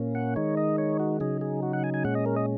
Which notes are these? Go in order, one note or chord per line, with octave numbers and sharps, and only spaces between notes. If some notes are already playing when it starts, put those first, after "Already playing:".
Already playing: A#2 A#3 C#4
F#5
D#3 G#3 D#4 C#5
D#5
C#5
F#4
C#3 F#3 D#4 G#4
G#4
F#4
F#5
G#5
G#5
A#2 G#3 C#4 F#5
D#5
A#4
D#5